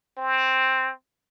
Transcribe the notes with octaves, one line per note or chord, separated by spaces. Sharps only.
C4